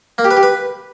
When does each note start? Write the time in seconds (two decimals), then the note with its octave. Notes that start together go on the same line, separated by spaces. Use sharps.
0.18 A#3
0.24 G4
0.31 B4
0.37 G4
0.43 B4